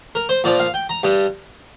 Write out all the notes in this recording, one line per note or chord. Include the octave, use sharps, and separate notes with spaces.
A#4
C5
A#2 F3 D5
F5
G5
A#5
G2 G3